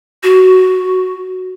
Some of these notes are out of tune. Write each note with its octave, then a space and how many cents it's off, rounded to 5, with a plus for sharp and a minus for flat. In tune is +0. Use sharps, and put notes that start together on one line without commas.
F#4 +5